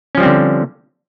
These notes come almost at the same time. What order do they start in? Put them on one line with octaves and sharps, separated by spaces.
C#4 F3 G3 C4 D3